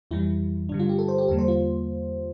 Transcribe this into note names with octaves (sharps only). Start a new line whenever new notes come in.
F2 E3 G3 E4
G2 D3 G3 D4
F4
G4
A4
C5
G4
E2 D3 G3 A#3 A4
C5
F4